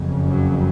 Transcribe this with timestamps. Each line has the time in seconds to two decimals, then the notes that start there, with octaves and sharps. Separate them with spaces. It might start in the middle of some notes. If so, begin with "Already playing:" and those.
Already playing: F#1 F2 C#3
0.27 F#2 F#3